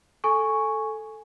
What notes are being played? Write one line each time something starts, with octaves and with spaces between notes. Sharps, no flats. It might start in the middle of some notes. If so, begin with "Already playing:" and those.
A4 G#5 C#6